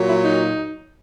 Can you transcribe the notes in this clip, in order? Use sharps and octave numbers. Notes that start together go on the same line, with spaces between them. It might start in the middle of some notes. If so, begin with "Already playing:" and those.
Already playing: A#2 F#3
E4
D#4